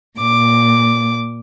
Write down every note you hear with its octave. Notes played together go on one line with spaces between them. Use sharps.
A#2 D6